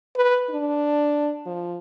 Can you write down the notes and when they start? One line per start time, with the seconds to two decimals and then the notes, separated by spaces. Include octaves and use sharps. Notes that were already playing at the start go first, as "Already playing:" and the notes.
0.16 B4
0.50 D4
1.46 F3